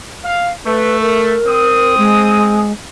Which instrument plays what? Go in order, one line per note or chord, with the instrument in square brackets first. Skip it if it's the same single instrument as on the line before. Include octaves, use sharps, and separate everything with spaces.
[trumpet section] F5
[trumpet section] A3 [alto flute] B4
[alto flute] A#4
[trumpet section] C4 D#6
[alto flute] G#3